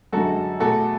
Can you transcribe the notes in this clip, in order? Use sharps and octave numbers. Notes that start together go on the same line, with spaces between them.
F#2 D3 G#3 F#4 A4
E2 B2 A3 F#4 A4